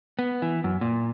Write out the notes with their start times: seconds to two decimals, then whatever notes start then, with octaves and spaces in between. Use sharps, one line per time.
0.19 B3
0.42 E3
0.64 F#2
0.81 A#2